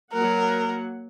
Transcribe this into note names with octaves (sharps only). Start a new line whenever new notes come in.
F#3 A#3 A#4 F#5